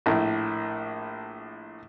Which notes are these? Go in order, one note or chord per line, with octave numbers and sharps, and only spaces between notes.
A#1 A2